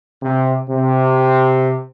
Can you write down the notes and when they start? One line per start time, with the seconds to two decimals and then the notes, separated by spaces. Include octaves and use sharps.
0.22 C3
0.70 C3